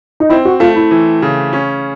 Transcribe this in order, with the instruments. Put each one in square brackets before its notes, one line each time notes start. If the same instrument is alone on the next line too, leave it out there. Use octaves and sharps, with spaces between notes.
[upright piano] D#4
[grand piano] C4 [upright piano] E4
[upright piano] F#4
[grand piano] A3 [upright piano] F4
[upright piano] E4
[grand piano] E3
C#3
C#4